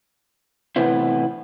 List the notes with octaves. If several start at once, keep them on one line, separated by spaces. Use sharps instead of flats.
A2 C3 E3 B3 C4 E4